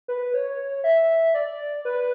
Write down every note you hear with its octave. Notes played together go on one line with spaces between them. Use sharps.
B4
C#5
E5
D5
B4